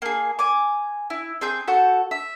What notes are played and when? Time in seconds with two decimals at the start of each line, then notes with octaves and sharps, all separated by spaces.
0.02 A#3 G#4
0.39 G#5 D6
1.10 E4
1.41 C4 G#4 G6
1.68 F#4 A4 F#5 G6
2.11 E5